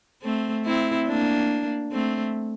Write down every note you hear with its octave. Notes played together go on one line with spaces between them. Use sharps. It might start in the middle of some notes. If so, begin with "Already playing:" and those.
A3 C4
C4 E4
A#3 D4
A3 C4